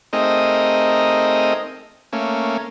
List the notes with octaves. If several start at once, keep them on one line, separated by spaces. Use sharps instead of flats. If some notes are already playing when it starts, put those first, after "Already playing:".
A3 C4 D#4 G#4 A#4 D#5
A3 A#3 C#4